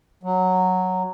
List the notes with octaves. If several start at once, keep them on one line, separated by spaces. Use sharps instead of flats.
F#3